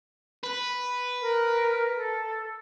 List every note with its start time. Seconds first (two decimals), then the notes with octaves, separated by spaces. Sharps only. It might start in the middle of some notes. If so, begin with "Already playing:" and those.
0.43 B4
1.21 A#4
1.96 A4